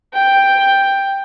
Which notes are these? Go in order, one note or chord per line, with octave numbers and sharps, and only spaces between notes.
G5